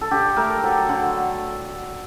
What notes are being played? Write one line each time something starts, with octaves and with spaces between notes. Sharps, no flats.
A4
D3 G4
A3 A#4
F#3 A4
D3